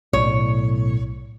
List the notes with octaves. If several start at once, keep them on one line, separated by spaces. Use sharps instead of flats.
B1 A2 C#5